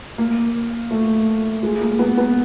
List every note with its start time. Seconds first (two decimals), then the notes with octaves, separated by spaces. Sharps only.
0.18 A#3
0.91 A3
1.63 G#3
1.81 A#3
1.99 B3
2.17 B3